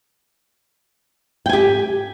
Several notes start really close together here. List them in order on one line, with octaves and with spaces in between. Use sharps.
G5 G#5 G4